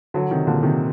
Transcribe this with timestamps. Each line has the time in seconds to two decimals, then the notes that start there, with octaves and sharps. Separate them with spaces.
0.14 D3 F#3
0.31 C3 D#3
0.47 A#2 D3
0.63 C3 D#3